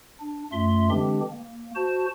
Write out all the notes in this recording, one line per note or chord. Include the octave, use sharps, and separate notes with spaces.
D4
F#2 A3 F4 E5 C6
D3 E3 G#3 C4 D4 G4
A#3
F#4 C5 A5